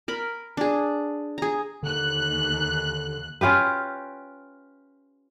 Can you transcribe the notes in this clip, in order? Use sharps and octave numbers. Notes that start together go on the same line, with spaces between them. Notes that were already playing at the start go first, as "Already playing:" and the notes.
A#4 B5
D4 G#4
G#4 A#5
D#2 D3 F#6
C#4 F4 G4 B4